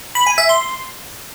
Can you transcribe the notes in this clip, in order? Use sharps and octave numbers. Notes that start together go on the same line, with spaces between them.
B5
G#5
E5
C6